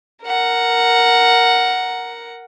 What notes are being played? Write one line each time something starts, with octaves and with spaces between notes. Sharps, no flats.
A#4 F#5